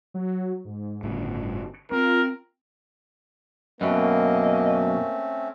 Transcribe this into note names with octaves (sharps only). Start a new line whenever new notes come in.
F#3
G#2
G1 A2 C#3
C4 F4 A#4
F#2 B2 A3 A#3 C4 C#4 D#5